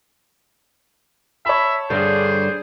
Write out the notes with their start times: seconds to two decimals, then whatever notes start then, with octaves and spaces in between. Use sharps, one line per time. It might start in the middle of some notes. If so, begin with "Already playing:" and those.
1.46 C#5 E5 A5 B5
1.90 G2 D3 D4 G#4 C5